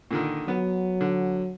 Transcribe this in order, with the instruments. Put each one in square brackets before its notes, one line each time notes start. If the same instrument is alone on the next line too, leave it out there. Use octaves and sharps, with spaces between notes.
[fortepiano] A#2 D3 D#3
[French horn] F#3 [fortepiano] B3
[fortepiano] D3